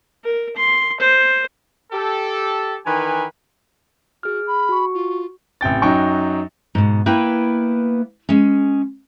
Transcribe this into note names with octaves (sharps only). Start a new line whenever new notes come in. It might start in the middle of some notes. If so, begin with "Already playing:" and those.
A#4
C6
C5
G4 A4
D#3 E3 B4 G#5
F#4 G#4 F6
B5
F#4 C#6
F4
A1 C3 G5 A6
F#2 F#3 D#4 G5 C#6
G#2 B2
A#3 B3 E4 B4 G5
G#3 C#4